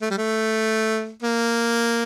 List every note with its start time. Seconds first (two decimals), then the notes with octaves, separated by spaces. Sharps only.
0.02 A3
0.10 G3
0.18 A3
1.22 A#3